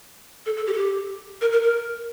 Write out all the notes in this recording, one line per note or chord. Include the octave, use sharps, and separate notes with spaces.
A4
A4
G4
A4
G4
A#4
A#4
A#4